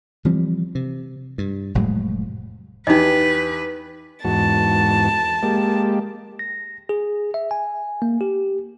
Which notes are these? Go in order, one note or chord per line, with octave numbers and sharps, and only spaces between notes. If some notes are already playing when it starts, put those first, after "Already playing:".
E3 F3 G3 C4
C3
G2
F1 A2 F#3 G#3
E2 D#4 G4 B4 D#5
E2 G#2 F#4 A5
G#3 A#3 G4
A#6
G#4
E5
G#5
A#3
G4